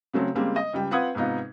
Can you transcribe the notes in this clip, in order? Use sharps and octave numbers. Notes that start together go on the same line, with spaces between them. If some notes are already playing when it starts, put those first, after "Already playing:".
C#3 F#3 A3 C4
C#3 G3 G#3 A#3 C4
D#5
C#2 G3 G5
C4 F4 B4 F#5 D#6 G#6
G#2 C3 B3 D#4 F4